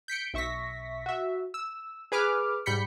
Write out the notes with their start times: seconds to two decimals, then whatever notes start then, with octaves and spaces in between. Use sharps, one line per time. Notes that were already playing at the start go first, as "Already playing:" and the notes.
0.08 G6 B6 C#7 D7
0.34 B1 E5 C#6 A#6 B6
1.06 F#4 E5
1.54 E6
2.12 G#4 B4 D6 F6
2.66 G#2 G3 B5 G6 B6 C#7